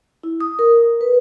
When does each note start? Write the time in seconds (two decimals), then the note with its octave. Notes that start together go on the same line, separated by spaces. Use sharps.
0.23 E4
0.40 D#6
0.59 A#4
1.01 B4